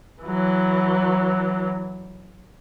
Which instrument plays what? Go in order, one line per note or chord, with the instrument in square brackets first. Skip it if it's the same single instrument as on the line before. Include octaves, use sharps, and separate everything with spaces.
[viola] E3 F#3